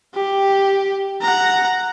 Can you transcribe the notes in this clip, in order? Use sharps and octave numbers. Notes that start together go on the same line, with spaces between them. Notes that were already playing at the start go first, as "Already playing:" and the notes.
G4
F#5 A#5